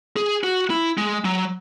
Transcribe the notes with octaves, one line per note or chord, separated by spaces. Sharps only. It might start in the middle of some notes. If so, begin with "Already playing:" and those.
G#4
F#4
E4
G#3
F#3